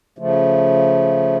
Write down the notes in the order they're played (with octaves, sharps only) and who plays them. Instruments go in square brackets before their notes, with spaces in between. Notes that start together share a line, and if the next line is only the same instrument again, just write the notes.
[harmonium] C#3 F3 A3